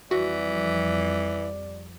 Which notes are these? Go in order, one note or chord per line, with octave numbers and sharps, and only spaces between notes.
F2 E3 G3 F#4 D5